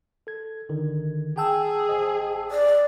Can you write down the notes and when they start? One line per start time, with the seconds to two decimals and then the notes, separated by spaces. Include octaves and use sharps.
0.27 A4 G#6
0.69 G#1 D3 D#3
1.37 G#4 F#5 G5 A5 E6
1.89 A1 C5 D#5
2.51 D5